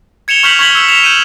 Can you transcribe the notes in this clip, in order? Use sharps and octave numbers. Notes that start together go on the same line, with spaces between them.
G#6 C#7 E7 F7 G7
C#6 F6 G6 B6 F7 F#7
C#6 G6 G#6 B6 F#7 G7
E6 G6 B6 E7
B6 E7 F7
G6 D#7